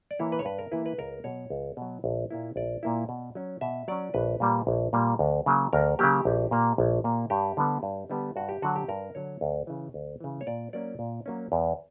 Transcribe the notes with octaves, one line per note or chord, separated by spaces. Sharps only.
D5
E3 A#3 E4 C#5
B4
C#5
G2 B4
A#4
E3 A#3 E4 B4
B4
C#2 A#4
B2 F#3 C#5
C#2
B2 F#3
A#1
A#2 A#3 E4
A#1 D5
A#2 A#3 E4
B2
F#3 C#4
B2 E5
F#3 C#4 D5
A#1 B4
A#2 G3 A#3
A#1
A#2 G3 A#3
D2
C#3 F#3 A#3
D2 A#4
C#3 F#3 A#3 G4
A#1
A#2 A#3
A#1
A#2 A#3
G2 G4
D3 G3 B3
G2
D3 G3 B3
G2 F#4
G4
D3 F#3 F#4
G4
G2 A#4
D3 F#3 C#5
D2
C#3 E3
D2
C#3 E3
C#5
A#2 D5
F#3 A#3 C#4 D5
A#2
F#3 A#3 C#4
E2